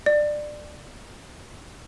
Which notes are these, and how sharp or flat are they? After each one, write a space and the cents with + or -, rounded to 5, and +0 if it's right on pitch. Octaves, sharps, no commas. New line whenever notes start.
D5 +20